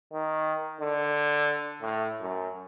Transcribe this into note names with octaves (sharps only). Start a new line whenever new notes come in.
D#3
D3
A2
F#2